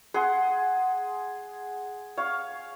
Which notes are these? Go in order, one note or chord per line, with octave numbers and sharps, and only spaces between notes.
G#4 F#5 C6
C#5 F5